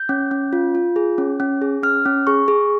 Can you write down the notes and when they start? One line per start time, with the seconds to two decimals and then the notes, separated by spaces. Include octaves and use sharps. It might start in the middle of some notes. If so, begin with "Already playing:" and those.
Already playing: G6
0.09 C#4
0.31 C#4
0.53 F4
0.75 F4
0.96 G#4
1.18 C#4
1.40 C#4
1.62 G#4
1.83 C#4 F6
2.06 C#4
2.27 G#4 C#6
2.48 G#4